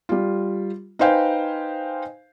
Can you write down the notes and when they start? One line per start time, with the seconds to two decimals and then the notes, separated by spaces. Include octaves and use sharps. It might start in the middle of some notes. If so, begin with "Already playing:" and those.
0.09 G3 F4
0.99 D#4 B4 C5 F5 G5 G#5